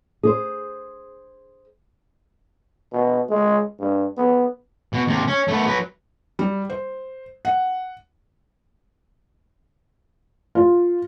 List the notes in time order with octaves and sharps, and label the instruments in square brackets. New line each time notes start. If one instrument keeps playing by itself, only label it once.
[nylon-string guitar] G#4 C5
[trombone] B2
G#3
G2
B3
[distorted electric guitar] B2
D#2 C3
C#4
A3 B3
F#3 B4
[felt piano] G3
C5
F#5
F4